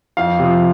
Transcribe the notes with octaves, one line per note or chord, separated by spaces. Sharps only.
F2 F5
C3 F3